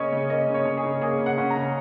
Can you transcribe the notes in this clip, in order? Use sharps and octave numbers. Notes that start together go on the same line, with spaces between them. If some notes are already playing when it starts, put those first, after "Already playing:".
Already playing: C#3 A#3 C#4 C#5 D#5
C#3
A#3 D#5
C#3
C#5
C#4
G#4
C#3
A#3 G#4
C#3
F#5
C#4
A#5
C#3